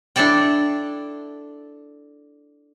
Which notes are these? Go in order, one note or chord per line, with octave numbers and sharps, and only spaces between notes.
D4 E4 A4 D5 G5